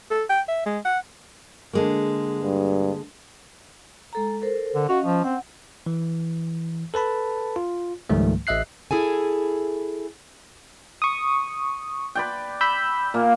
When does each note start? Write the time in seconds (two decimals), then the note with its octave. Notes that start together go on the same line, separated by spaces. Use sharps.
0.11 A4
0.29 G5
0.48 E5
0.66 G#3
0.85 F#5
1.73 D3 G#3 A#3
2.41 G2
4.13 G#3 A4 A#5
4.42 A4 A#4 C5
4.75 D3
4.89 C#4 F#4 D#5 F5
5.05 F3
5.24 C4 F#5
5.86 E3
6.94 A4 B4 A5 B5
7.56 F4
8.10 C#2 G#2 D#3 F3 G3 A3
8.47 A1 D#5 E5 F#6 C7
8.91 E4 G#4 A4 G#5
11.02 C#6 D#6
12.15 B4 D5 G5
12.61 B5 E6 G6
13.14 A#2 A#3